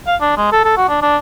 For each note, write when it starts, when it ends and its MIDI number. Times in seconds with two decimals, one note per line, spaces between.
0.07 0.16 77
0.21 0.35 62
0.37 0.50 56
0.52 0.60 69
0.65 0.76 69
0.77 0.88 66
0.89 1.00 62
1.02 1.17 62